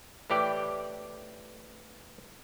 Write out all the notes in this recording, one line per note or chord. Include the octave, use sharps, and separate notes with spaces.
A2 E3 G4 D5 G5